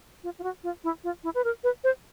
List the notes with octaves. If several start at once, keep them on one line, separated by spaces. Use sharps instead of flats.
F4
F4
F#4
F4
E4
F4
E4
B4
A#4
B4
C5